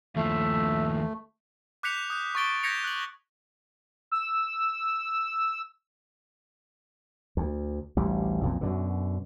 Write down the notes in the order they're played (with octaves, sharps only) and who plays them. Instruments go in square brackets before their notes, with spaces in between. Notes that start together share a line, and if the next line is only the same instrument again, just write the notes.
[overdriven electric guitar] D#2 F3 [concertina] A3 [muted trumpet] E5
[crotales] D6 F#6 G6 B6 C#7 F7
D#6 F#6 G6
C#6 D6 A6 D7 G7
G6 G#6 A#6 B6 C#7 F7
F#6 F#7
[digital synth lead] E6
[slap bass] D2
A1 D2 G3
B1 F2 A#2
F#2 B2 D3